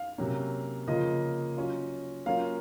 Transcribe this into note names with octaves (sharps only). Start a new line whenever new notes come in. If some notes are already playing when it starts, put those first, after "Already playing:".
Already playing: F5
C3 F#3 A#3 C#4
C#3 F3 A#3 F4 D#5
F#3 C#4 F4
F#3 A#3 C#4 F4 F5